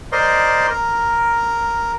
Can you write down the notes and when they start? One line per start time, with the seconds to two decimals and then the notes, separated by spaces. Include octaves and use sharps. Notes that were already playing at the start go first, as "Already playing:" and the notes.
0.12 A#4 C5 D5 D#5 C6
0.70 A#4